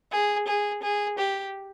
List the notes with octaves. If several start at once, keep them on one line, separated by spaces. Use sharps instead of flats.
G#4
G#4
G#4
G4